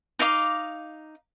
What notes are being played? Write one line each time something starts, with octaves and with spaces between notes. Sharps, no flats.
D#4 D#5 F5 D6